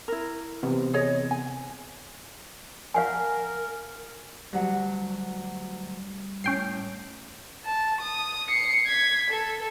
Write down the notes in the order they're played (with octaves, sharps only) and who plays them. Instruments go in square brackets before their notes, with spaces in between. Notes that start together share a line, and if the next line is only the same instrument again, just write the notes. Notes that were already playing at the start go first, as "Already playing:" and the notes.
[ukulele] E4 A#4
[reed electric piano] C3 E3 B3
[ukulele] G#4 C#5 D#5
G#5
[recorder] A#4 [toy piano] F5 F#5 G#5
[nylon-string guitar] D2 F#3 F#5 [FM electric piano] G3
[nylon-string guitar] A2 [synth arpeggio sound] C#4 G5 C7
[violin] A5
D#6
C7 C#7
G#6 B6
A4